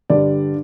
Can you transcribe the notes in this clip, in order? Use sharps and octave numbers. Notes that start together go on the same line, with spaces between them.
G2 D3 G3 D5